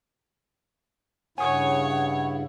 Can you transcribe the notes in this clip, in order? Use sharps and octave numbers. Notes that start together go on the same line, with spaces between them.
G2 C#3 E4 C#5 F#5 G#5 D#6